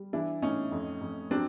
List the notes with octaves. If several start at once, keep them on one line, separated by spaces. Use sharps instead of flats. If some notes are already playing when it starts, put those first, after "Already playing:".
Already playing: G3
E3 D4 E4
A2 C#4 D#4
F2
F2
F#3 C4 D4